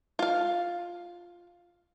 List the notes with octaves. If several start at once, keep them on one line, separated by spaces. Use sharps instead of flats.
F4 F5